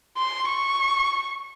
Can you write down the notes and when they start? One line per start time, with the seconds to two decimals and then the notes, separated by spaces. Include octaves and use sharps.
0.17 C6
0.48 C#6